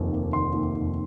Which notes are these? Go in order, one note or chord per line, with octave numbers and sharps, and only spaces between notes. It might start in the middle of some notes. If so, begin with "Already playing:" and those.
Already playing: F1 D#2 D#3
A#3
D#3 C6
D#2
F1